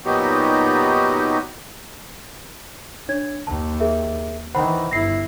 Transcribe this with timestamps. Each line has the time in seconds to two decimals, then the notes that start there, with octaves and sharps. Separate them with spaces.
0.05 A#2 F#3 B3 D#4 F#4 G4
3.09 D4 C#5 G#6
3.47 D#2 A5
3.80 G#4 A#4 E5
4.55 D#3 E3 C5 F#5 B5
4.91 G1 E4 A#6 C7